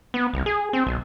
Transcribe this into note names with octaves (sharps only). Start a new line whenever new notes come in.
B3
C2
G#4
C4
B1